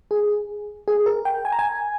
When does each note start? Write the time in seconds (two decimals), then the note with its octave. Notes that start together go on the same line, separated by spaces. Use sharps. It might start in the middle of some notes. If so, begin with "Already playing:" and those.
0.11 G#4
0.88 G#4
1.06 A#4
1.25 G5
1.45 G#5
1.52 A#5
1.59 G#5